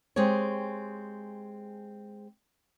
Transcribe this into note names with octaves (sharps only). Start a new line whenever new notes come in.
G#3 C4 G4 G#4 C#5